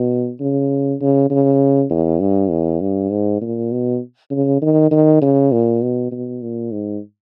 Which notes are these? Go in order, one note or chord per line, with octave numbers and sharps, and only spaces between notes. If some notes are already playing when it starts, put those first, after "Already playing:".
Already playing: B2
C#3
C#3
C#3
E2
G2
E2
G2
G#2
A#2
B2
C#3
D#3
D#3
C#3
A#2
B2
B2
A#2
G#2